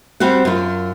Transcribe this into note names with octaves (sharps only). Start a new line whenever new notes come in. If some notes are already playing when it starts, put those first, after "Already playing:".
G3 C4 F#4 F#5
F#2 F4